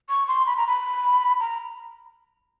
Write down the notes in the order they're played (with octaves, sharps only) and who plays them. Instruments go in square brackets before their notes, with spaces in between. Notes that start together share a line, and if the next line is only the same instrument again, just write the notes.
[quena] C#6
C6
B5
A#5
B5
A#5